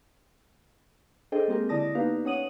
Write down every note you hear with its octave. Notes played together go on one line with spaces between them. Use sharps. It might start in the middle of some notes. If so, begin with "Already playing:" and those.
D4 G#4 A4 C5 D#5 G5
G#3 A#3 C4 G4 G#4 A#4
D3 E4 D5 A5 D#6 A#6
A#3 B3 D#4 G4 B4 F5
C#4 C#5 F#5 D#6 D#7 F#7